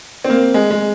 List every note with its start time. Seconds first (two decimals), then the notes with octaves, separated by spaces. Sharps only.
0.24 C4
0.30 A#3
0.54 G#3
0.71 G#3